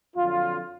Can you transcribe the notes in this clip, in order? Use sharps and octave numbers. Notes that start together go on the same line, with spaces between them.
F2 D3 F#3 F4